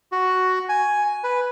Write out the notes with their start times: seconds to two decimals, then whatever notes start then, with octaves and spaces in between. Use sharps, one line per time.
0.12 F#4
0.69 G#5
1.24 B4